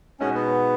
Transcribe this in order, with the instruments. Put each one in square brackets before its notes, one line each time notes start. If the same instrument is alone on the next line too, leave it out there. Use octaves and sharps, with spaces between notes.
[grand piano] B2 G#3 D#4 F#4 [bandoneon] C#4
[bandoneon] B3